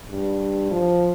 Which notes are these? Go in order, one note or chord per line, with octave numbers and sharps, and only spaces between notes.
G2
F3